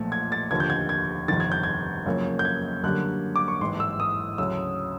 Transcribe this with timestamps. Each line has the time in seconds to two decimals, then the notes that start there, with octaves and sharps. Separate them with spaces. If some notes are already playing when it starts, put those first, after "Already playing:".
Already playing: B1 A#2 F3 A3
0.12 G#6
0.32 A6
0.51 F1 D#2 D3 F3 G#6
0.60 G6
0.70 G#6
0.89 G#6
1.28 G1 F2 C3 D#3 A6
1.40 G#6
1.52 G6
1.64 G#6
2.06 F#2 C#3 F3 A#3
2.39 G6
2.45 G#6
2.83 F#2 D3 G3 A#3 F#6
3.36 D6
3.48 C#6
3.60 A1 G#2 E3 C6
3.80 E6
4.00 D#6
4.38 D2 C#3 F#3 E6